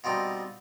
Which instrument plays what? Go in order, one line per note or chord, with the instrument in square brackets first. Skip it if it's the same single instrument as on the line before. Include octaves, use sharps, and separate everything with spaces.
[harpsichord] B2 G3 C4 D#4 F4